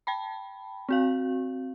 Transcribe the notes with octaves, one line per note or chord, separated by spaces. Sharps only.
G5 A5 B5
C4 F#4 F5